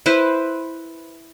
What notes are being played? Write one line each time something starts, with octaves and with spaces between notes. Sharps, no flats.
E4 B4 C5